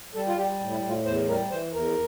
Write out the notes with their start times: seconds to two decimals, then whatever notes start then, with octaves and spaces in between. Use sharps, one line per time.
0.15 G3 A4
0.28 F4
0.37 G3 G4
0.60 A2
0.71 E4
0.83 A2
0.88 F4
1.05 E2 C5
1.28 G3 A#4
1.51 E3 C5
1.74 E2 A#4